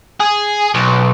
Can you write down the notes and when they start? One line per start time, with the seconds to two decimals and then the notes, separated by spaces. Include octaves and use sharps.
0.20 G#4
0.75 B1